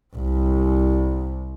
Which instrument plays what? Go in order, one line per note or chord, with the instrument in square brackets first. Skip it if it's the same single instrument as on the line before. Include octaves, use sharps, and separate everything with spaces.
[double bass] C2